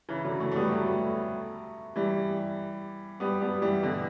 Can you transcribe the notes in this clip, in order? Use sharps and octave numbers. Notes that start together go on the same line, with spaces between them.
C#3 E3
D3 F#3
F#3 A3
A3
G3 B3
F#3 A3
E3 G3
G3 B3
G3 B3
E3 G3
B2 D3